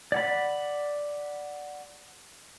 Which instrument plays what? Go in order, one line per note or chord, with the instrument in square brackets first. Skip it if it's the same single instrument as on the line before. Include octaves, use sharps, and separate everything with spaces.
[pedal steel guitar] D5 F#5 B5